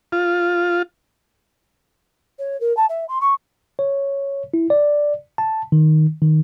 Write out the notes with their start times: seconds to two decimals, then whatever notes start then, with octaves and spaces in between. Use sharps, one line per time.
0.12 F4
2.39 C#5
2.61 A#4
2.77 A5
2.89 E5
3.09 C6
3.21 C#6
3.79 C#5
4.54 E4
4.70 D5
5.38 A5
5.72 D#3
6.22 D#3